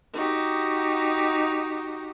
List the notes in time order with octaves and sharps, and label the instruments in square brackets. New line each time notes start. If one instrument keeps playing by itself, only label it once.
[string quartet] D#4 F#4 G4